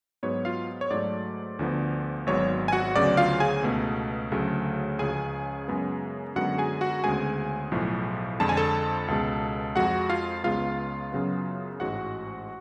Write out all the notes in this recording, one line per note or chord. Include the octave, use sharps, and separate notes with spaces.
G#2 F#3 B3 C#5
F4 F5
C#5
G#2 F#3 A3 D5
D2 D3 F3 B3
G#1 G#2 F#3 B3 C#5
G#5
F#4 F#5
D2 C#3 F#3 B3 D5
F4 F5
G#4 G#5
C#2 B2 A3
D2 C#3 F#3 A3
C#2 C#3 F3 G#4 G#5
F#2 C#3 G#3 B3
F#2 D3 G#3 B3 F#4 F#5
G#4 G#5
F#4 F#5
D2 C#3 G#3 B3 G#4 G#5
B1 A2 F3
F2 D3 F3 G#3 A5
G#5
A4 A5
C#2 B2 G#3
F2 F3 G#3 F#4 F#5
F4 F5
C#2 C#3 G#3 B3 F4 F5
F#2 C#3 F#3 B3
A1 G#2 G#3 F#4 F#5